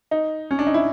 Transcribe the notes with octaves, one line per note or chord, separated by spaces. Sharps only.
D#4
C#4
D4
D#4
E4